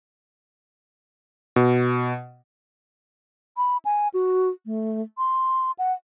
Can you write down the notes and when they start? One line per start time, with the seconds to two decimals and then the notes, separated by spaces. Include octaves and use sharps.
1.56 B2
3.57 B5
3.85 G#5
4.14 F#4
4.66 A3
5.18 C6
5.79 F#5